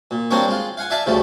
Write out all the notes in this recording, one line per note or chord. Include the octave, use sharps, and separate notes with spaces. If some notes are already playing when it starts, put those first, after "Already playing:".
A#2
G3 A#3 C4 D4 A#4 C#5
G#3 F4
F5 F#5 G#5
D5 E5 F5 G#5 A5
D2 C#3 F3 G3 A3